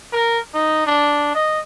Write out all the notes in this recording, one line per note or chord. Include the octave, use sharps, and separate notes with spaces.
A#4
D#4
D4
D#5